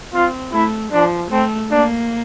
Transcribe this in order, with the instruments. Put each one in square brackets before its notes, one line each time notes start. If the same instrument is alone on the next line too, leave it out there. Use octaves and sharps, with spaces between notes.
[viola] C4 [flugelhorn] F4
[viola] A3 [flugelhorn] E4
[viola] F3 [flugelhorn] D4
[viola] A3 [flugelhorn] C4
[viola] A#3 [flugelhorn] D4